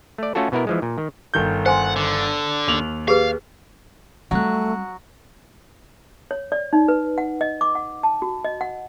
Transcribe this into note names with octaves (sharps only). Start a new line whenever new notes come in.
A3 D5
A3 C#4 F4 F#4 A4
B2 B3 E4 A#4
E3 F3 G#3
A#2
D#3
G1 D#3 G6
C5 F#5 G#5 C6
D3
D#2 F7 F#7
G4 G#4 B4 F5
F#3 G3 A3 C4 F#5 F#6
C#5
D5
D#4
B4
F#5
D#5
D6
F#5
A5
F#4
D#5
F#5